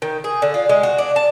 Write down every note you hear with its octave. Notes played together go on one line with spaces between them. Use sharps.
D#3
G#4
D3
F4
G#3
F#4
D4
A5